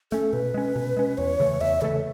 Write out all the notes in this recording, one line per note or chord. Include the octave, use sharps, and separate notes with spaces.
A3 C#4 A4
B2 B4
G#3 C#4
B2
G#3 C#4
E2 C#5
C#3 E3 A3
E2 E5
C#3 E3 A3 A4